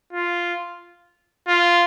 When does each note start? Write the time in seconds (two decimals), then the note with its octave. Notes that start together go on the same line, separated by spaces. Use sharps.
0.13 F4
1.48 F4